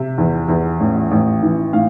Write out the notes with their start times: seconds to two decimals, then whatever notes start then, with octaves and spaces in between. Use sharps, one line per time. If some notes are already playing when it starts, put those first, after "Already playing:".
Already playing: C3 E5
0.18 E2
0.48 E2
0.80 A1
1.11 A1
1.42 E3
1.73 A2 F5